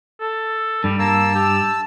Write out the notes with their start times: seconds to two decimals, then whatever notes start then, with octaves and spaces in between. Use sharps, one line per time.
0.21 A4
0.84 G2 G3
0.99 A#3 A5 E6
1.35 G4